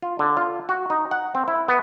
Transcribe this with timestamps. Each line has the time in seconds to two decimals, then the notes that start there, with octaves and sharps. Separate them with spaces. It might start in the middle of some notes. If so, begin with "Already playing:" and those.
0.02 F4
0.19 D3
0.37 F4
0.69 F#4
0.90 D#4
1.11 F#5
1.35 C4
1.48 E4
1.68 B3